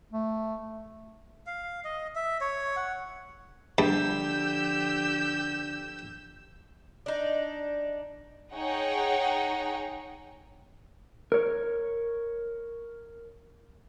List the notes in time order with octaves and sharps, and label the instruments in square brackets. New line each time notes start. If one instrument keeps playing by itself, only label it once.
[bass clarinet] A3
[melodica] F5
D#5
E5
C#5
F#5
[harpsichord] G2 [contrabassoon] D3 [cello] F3 G4 [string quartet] E6 G6
[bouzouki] D4 D#4
[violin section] D#4 G#4 C#5 F#5 G5
[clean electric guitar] A#4 C#5